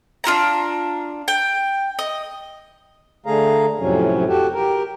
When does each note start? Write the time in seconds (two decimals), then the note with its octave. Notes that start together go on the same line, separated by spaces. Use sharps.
0.24 D4 F4 A5 A#5
1.28 G5
1.99 D#5
3.26 D3 A3 G#4 F5 A#5
3.79 F2 A2 C3 F#3 C#4
4.27 F#4 G4 A4
4.54 G4 A#4